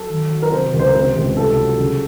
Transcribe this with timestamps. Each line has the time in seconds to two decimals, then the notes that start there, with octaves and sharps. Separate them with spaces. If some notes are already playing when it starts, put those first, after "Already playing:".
Already playing: F#3 A4
0.09 D#3
0.31 F#3
0.42 A#4
0.51 C3 C5
0.73 C#2
0.79 C5
0.88 A#4
0.94 C3 C5
1.16 C#2
1.36 C2 A4
1.58 F#3
1.79 C#3